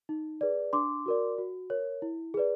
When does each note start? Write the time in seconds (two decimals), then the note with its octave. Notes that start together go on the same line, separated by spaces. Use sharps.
0.09 D#4
0.41 G#4 B4 D5
0.73 D4 C6 D6
1.06 F#4 A#4 D5
1.38 F#4
1.70 A#4 C#5
2.02 E4
2.34 G#4 B4 D5